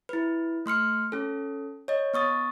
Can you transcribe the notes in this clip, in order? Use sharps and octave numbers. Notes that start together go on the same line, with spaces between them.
E4 B4
A3 C6 F6 C#7
C#4 A4
C#5 D#5
B3 C#6 D#6 A6